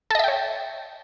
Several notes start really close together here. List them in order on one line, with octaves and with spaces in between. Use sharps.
A4 D#5 E5 G5 C#5